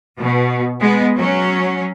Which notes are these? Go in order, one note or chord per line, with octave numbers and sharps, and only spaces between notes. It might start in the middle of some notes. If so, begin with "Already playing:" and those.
B2
G#3 B3
F#3 C#4